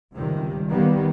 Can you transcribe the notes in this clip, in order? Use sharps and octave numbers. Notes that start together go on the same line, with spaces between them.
C#2 C3 D#3 G3
D#3 G3 A#3 B3